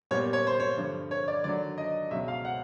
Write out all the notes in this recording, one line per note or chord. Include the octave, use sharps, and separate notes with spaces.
A#2 G3 B3 C#5
C#5
C5
C#5
G2 D3 F3
C#5
D5
D#2 D3 F#3 D5
D#5
C#2 B2 F#3 E5
F5
F#5